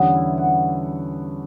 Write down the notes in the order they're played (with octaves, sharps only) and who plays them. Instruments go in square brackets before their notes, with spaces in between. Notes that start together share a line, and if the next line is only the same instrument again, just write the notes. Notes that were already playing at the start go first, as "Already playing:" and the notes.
Already playing: [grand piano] E2 D3 G3 C#4 [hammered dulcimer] B3
[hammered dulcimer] E4
F#4